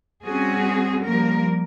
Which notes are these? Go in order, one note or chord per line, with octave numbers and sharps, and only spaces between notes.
G3 C4 C#4 F#4 G#4
F3 G3 A#3 A#4